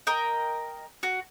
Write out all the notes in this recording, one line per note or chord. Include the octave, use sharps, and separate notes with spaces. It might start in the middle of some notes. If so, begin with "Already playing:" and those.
A#4 D#5 G5
F#4